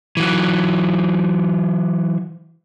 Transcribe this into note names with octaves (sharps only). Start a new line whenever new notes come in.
E3 F#3